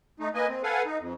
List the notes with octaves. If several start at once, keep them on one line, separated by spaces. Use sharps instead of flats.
A3 D#4
A#3 B4 D#5 G#5
C4
A4 B4 F5 F#5 G#5
D#4
F2